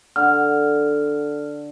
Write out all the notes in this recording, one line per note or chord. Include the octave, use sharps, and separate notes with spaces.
D3 F6